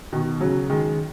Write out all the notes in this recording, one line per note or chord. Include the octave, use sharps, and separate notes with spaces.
B2 D#3
C#3 F#3
D#3 G#3